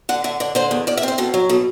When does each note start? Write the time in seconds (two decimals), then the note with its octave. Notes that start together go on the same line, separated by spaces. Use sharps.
0.09 D3 F#5
0.24 D3 E5
0.40 D3 D5
0.55 D3 C5
0.71 E2
0.87 E2 D5
0.97 E5
1.03 C4 C5
1.18 B2 A4
1.34 F#3
1.49 B2 A4